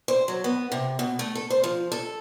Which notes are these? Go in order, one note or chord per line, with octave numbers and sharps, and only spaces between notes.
C5
F#3
B3
C3
B2
A3
A4
C5
F3
A4